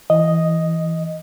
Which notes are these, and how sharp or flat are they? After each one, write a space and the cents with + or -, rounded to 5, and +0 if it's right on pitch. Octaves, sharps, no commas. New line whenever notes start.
E3 +0 D#5 +0